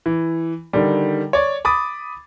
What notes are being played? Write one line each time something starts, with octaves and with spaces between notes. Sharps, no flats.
E3
D3 D#3 G3
C#5 D5
B5 D6 D#6 A6